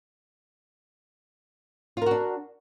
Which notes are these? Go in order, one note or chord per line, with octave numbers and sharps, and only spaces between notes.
D4 F4 F#4 A#4